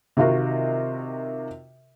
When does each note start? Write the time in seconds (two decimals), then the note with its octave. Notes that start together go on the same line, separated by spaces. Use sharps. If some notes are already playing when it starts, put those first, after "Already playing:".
0.17 C3 D#3 D#4 F4 F#4 A#4